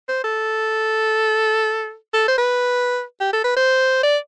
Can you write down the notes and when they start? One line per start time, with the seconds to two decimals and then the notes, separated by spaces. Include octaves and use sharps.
0.08 C5
0.24 A4
2.14 A4
2.28 C5
2.38 B4
3.21 G4
3.33 A4
3.44 B4
3.56 C5
4.03 D5